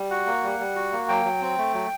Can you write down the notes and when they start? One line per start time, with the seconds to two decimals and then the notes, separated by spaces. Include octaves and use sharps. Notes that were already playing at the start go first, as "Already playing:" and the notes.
Already playing: G3
0.11 F#4 F#5
0.26 A#3
0.43 G3
0.59 G3
0.76 F#4
0.92 A#3
1.08 F#3 G5
1.25 F#3
1.42 C4
1.58 A3
1.74 F#3